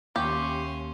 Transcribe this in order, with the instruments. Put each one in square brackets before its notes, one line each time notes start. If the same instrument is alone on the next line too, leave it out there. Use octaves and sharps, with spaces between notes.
[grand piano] D#2 [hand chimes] A#3 [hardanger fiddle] C#4 C6 [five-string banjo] G4